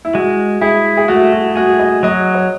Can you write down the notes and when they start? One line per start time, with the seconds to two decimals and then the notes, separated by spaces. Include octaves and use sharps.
0.05 E4
0.14 G#3 F#4
0.61 E4 G#4
0.97 G#4
1.08 A3 F#4
1.32 F#4
1.56 F#4 G#4
1.79 D#5
2.03 F#3 D#5
2.34 C#5